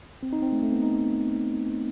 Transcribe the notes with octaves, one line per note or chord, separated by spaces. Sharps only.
C4
D#4
C4
A3
A3
B3
D#4